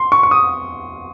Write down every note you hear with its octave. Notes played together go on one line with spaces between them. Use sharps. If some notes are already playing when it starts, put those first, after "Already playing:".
Already playing: C6
C#6
C#6
D#6